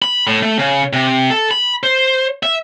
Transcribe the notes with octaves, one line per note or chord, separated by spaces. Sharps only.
B5
A2
A3
C#3
C3
A4
B5
C5
E5